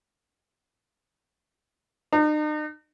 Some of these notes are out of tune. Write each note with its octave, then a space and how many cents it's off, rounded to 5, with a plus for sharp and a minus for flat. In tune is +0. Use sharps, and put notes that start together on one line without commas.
D#4 -45